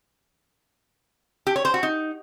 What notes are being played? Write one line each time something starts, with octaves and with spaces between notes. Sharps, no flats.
G4
C#5
C5
F#4
D#4